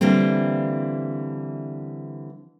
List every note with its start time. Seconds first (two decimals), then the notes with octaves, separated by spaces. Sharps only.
0.01 D3 E3 G3 A#3 C4